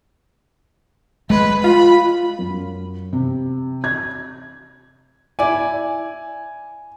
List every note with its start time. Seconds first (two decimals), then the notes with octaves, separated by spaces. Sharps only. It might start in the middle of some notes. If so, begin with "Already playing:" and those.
1.30 G#3 B4
1.64 F4 B5
2.39 F#2
3.13 C3
3.84 G#6
5.39 E4 D5 G#5